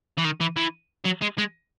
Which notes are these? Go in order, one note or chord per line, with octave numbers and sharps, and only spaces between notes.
E3
D#3
E3
E3
F#3
G#3
G#3